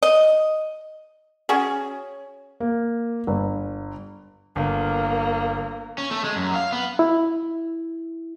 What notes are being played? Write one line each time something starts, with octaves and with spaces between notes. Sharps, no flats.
D#5
C#4 F#4 G#4
A#3
G1
G1 A#3
C#4
A3
G#3
F#2
F5
B3
E4